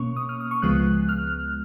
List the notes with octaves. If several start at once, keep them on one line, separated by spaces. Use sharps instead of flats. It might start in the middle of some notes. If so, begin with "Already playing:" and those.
Already playing: B2 A#3 C#4 C#6
D#6
F6
D#6
C#6
C#2 C#3 F3 G#3 B3 F#6
F6